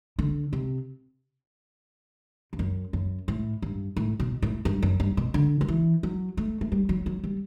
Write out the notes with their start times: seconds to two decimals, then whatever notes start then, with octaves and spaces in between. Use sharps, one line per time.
0.19 D3
0.53 C3
2.53 G2
2.59 F#2
2.93 F#2
3.28 A2
3.62 G2
3.97 A2
4.20 B2
4.42 A2
4.65 G2
4.83 F#2
5.00 G2
5.17 B2
5.34 D3
5.61 F#3
5.68 E3
6.03 F#3
6.37 A3
6.61 A3
6.72 G3
6.89 F#3
7.06 F#3
7.24 G3